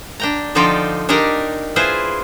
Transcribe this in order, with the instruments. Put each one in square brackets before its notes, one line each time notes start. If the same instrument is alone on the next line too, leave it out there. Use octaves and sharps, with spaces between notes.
[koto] D4 G5 A#5
D3 F3 D#4 F4 D5 G5
D4 D#4 G4 A#4 D5 D#5
E4 F4 G#4 B4 C5